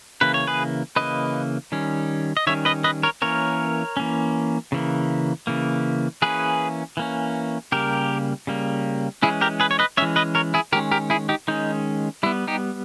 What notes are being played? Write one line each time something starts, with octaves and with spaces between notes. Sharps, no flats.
C#3 E3 A#3 B4
C#5
G#4 B4
C#3 E3 A#3 B4 D#5
D#3 G3 C#4
D#5
D#3 G3 C#4 C#5 E5
B4 D#5
B4 D#5
A#4 C#5
E3 A#3 C#4 A#4 C#5
E3 A#3 C#4
C#3 E3 A#3
C#3 E3 A#3
E3 A#3 C#4 G#4 B4
E3 A#3 C#4
C#3 G3 A#3 G4 A#4
C#3 G3 A#3
E3 G#3 C#4 E4 G#4
G4 A#4
G#4 B4
C#5
B4 D#5
E3 G#3 C#4 C#5 E5
B4 D#5
A#4 C#5
E4 G#4
D#3 G#3 C#4 G4 A#4
G4 A#4
E4 G#4
D#4 G4
D#3 G#3 C#4 D#4
G3 B3 E4
D#4 G4